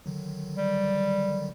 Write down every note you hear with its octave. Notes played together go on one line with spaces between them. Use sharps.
D3 D#3 F#3
G3